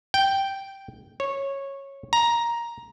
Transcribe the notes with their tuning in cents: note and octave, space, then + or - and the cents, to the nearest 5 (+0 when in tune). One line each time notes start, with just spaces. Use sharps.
G5 -5
C#5 -10
A#5 +10